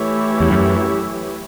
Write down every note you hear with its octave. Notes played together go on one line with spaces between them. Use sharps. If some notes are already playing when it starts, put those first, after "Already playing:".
Already playing: E3 A3 E4 G4 C#5
E2
F#2